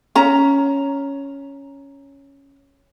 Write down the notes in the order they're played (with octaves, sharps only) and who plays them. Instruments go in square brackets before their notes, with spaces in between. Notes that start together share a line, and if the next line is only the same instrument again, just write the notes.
[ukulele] C#4 A#5